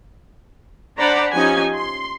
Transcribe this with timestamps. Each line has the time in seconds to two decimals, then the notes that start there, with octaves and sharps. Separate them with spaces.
0.98 D4 C5 D5 F#5 A#5 B5
1.32 F3 C#4 D#4 G4 G#5
1.75 C6